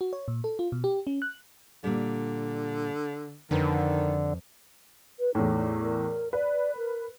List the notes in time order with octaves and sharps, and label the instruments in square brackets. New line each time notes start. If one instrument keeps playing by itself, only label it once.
[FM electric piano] F#4
C#5
A#2
A4
F4
B2
G4
C#4
F#6
[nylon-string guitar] A#2 G3 [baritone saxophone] D3
[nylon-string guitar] F2 B4 [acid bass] D3 [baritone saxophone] D#3
[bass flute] B4
[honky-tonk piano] E2 A2 [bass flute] D#4
[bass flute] A#4
[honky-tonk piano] B4 [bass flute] D5
[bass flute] A#4